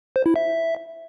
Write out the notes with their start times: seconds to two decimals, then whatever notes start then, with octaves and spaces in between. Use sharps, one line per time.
0.16 C5
0.26 E4
0.36 E5